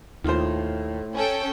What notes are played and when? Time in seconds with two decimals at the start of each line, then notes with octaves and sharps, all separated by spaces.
0.24 D#2 A2 D#3 F4 C5
1.14 C#4 A4 G5